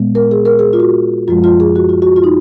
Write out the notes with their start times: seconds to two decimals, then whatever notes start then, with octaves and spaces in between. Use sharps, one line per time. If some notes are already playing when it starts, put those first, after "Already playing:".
Already playing: A#2 G#3 B3
0.15 A#4
0.31 G#4
0.45 A#4
0.59 G#4
0.73 F4
0.80 F#4
1.28 F#2 F3 G#3 F4
1.44 F4
1.60 G#4
1.76 F#4
1.89 F4
2.02 F#4
2.16 F4
2.24 D#4